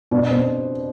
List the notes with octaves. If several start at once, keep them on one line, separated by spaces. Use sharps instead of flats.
B2 D4 D5
B2 C4 C5